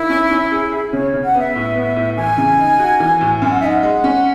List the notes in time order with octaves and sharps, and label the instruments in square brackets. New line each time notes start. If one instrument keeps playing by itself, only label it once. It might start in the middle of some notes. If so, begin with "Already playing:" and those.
Already playing: [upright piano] D#3 [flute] E4
[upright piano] C#4
C#4
G#4
G#4
[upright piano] C#3 [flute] C#5
[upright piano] C#3
[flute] F#5
[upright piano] B3
[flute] E5
[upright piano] A2
B3
A2
[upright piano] E3 [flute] G#5
[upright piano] C#3
D#4
F#4
E3
A2
[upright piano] F#2 [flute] G#5
[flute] F#5
[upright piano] D#4 [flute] E5
[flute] F#5
[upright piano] G#3
C#4